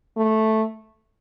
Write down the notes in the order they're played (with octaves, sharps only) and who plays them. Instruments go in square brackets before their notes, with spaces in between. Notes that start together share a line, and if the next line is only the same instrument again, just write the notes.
[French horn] A3